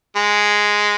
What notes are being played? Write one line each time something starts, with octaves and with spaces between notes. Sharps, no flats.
G#3